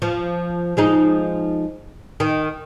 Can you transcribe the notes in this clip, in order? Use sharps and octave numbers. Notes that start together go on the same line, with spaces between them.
F3
F3 G#3 D#4
D#3